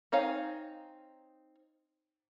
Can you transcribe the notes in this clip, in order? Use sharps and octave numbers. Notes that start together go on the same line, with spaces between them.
C4 D#4 C#5 F5 G#5